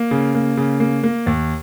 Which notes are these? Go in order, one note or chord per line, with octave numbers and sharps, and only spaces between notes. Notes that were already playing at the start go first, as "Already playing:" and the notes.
Already playing: A#3
C#3
A#3
C#3
A#3
A#3
D#2